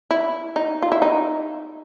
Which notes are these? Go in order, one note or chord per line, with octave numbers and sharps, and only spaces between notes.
E4
D#4
F4
E4
D#4